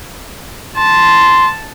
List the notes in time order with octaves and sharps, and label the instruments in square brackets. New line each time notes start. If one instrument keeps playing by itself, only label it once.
[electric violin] A5 [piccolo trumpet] C6